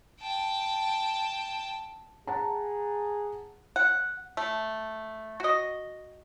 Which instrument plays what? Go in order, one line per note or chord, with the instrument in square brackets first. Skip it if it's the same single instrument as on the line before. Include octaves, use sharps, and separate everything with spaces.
[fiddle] G5 A5
[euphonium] G#4 [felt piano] F#5 A5 A#5
[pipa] F#5
A3
F#4 D#5